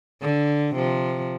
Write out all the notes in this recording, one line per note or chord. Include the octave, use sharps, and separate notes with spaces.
D3
C3 F3